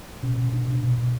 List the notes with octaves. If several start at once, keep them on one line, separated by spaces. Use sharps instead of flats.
B2 C#4
B2
B2 D4
B2
B2
B2